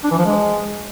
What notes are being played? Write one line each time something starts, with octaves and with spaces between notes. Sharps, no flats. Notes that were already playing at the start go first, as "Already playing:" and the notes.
D4
E3
F3
G#3